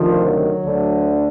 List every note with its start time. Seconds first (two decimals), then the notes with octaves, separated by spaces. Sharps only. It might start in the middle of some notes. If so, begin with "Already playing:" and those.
Already playing: D2 C3 D#3 F3
0.25 F#3
0.64 D2 D3